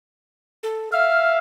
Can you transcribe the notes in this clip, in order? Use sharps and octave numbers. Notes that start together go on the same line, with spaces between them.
A4
E5 F5 F6